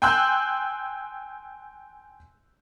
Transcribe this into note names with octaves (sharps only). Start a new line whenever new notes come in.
G5 G#5 C6 E6 F#6 G6